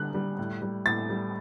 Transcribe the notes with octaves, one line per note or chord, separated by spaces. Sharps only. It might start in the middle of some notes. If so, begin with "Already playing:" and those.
Already playing: D3 G3 F#6
G3
A2
G3
A2 A6
G3